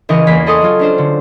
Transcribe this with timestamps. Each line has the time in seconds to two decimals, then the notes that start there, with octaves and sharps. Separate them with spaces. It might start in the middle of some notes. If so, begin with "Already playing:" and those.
0.09 C#2 E3 A#4 D#5 G#5 C#6
0.27 E2 A#3 B6 C7
0.46 G#4 A4 D#5 C6 C#6 D#6
0.62 F#3 F4
0.79 C#4 D4 C5
0.98 D3